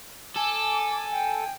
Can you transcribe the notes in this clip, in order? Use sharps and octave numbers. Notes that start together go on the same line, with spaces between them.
A4 G#5 D6
G5